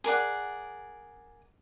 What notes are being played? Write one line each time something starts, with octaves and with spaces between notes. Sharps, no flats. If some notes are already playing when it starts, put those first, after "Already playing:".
G#4 A#4 D5 F#5